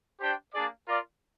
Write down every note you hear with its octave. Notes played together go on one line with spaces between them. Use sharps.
D4 G4 C5 G5
A#3 D4 G#4 D5
F4 A#4 D5 F5